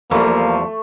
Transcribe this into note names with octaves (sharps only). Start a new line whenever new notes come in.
E2 F3 G3 A3 A#3